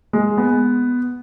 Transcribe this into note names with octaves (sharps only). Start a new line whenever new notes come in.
G#3
B3